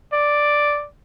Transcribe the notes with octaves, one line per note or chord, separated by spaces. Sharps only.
D5